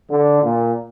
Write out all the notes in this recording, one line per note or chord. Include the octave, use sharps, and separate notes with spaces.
D3
A#2